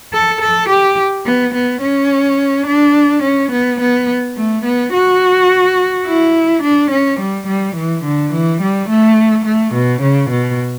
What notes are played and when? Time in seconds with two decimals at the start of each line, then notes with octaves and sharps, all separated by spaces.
0.13 A4
0.41 A4
0.70 G4
1.26 B3
1.54 B3
1.82 C#4
2.67 D4
3.23 C#4
3.52 B3
3.81 B3
4.37 A3
4.65 B3
4.93 F#4
6.06 E4
6.63 D4
6.91 C#4
7.20 G3
7.47 G3
7.76 E3
8.04 D3
8.33 E3
8.61 G3
8.89 A3
9.45 A3
9.74 B2
10.02 C#3
10.30 B2